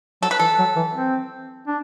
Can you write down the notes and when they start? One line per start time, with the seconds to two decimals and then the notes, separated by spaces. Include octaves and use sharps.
0.22 F#3 A4
0.31 B4
0.39 E3 A4
0.59 F#3
0.76 E3
0.95 C4
1.67 D4